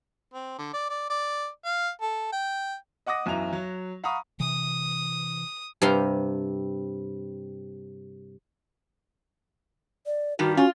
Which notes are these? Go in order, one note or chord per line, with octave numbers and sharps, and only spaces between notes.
C4
D3
D5
D5
D5
F5
A4
G5
D#5 F#5 D6 D#6 A#6
B1 F#2 E3 A#5 F7
F#3
F5 F#5 A#5 B5 C#6 D#6
C3 E3 D#6
G2 C3 G4 F5 A#5 C6
D5
G2 D#3 G3 F#4
C#4 F4 F#4